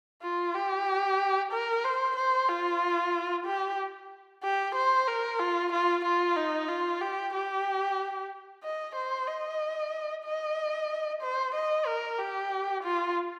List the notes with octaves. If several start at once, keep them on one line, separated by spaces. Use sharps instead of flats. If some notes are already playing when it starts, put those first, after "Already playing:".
F4
G4
A#4
C5
C5
F4
G4
G4
C5
A#4
F4
F4
F4
D#4
F4
G4
G4
D#5
C5
D#5
D#5
C5
D#5
A#4
G4
F4